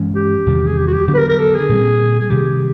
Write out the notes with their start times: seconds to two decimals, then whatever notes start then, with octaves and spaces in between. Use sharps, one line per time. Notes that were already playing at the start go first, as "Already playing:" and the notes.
Already playing: G2 E3 G#3 C#4
0.16 G4
0.46 E2 C3 D#3 G3
0.66 G#4
0.77 G4
0.87 F#4
0.93 G4
1.07 D3 F#3 B3 D4 G4
1.14 B4
1.18 A#4
1.28 A#4
1.39 A4
1.54 G#4
1.69 A#2 G3 C4
2.20 G#4
2.30 C3 D#3 G3 G4